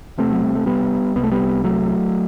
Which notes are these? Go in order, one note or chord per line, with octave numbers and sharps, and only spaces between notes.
E1 E2 C3 A3 C4
F#3
G3
A3
G3 B3
C2 C3 B3
A3
G3 B3
F#3 A3